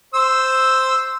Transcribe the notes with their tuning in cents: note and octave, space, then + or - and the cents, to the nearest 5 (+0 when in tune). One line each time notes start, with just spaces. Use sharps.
C5 +0 E6 +0